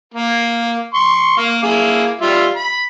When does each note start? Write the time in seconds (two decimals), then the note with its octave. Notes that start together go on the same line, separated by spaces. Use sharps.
0.14 A#3
0.94 C6 C#6
1.38 A#3 F5
1.63 A#3 E4 G#4
2.21 G3 F4 E5
2.56 B5